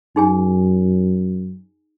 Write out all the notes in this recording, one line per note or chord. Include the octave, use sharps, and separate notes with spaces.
F#2 D#4 G#4 G#5